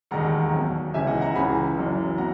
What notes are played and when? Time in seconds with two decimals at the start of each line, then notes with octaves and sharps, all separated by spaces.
0.11 E1 D#2 D#3 F#5 A#5
0.52 B1 B2
0.94 C#2 C#3 E3 E5 G#5
1.07 D#5 F#5
1.21 F#5 A#5
1.35 C#2 C#3 E3 G#5 B5
1.77 F#1 F#2 E3
2.18 B2 F#5 A#5